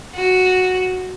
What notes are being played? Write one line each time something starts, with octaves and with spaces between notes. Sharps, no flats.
F#4